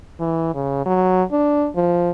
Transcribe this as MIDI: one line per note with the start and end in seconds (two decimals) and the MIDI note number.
0.19 0.51 52
0.54 0.84 49
0.86 1.23 54
1.32 1.68 62
1.76 2.10 53